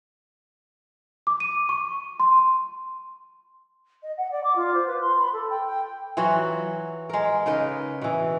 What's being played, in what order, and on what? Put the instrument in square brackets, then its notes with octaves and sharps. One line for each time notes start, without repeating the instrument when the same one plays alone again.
[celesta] D6
D#7
C#6
C6
[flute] D#5
F#5
D5
D6
F4
C5
B4
C6
B5
A4
G5
G5
[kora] E3 F#3 F4 F#4
G#3 A#4
C#3 D#4 A#4 B4
B2 E3